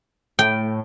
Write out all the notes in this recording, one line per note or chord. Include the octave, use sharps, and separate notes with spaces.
A2 G5